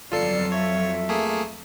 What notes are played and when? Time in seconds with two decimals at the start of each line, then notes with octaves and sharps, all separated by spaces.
0.12 G1 F2 F#3 F4 A4 D5 C7 C#7
0.52 C#5 E5
1.09 A3 A#3 G#4